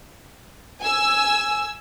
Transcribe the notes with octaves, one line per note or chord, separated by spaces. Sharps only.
G#5 E6